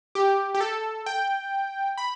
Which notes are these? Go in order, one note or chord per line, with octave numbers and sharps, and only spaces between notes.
G4
G4
A4
G5
B5